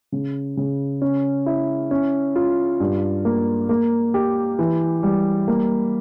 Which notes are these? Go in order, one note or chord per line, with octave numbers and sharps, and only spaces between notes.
C#3
C#3
C#4
E4
C#4
F4
G2
A#3
A#3
G4
E3
G3
A#3